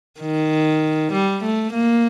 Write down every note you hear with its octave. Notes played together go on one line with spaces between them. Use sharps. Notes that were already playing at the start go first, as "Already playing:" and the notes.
D#3
G3
A3
A#3